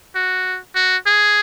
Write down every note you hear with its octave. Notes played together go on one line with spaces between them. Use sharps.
F#4
F#4
G#4